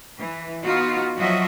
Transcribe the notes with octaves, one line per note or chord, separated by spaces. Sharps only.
E3
B3 D#4 F4 F#4
F3 F#3 F#4 D#5 E5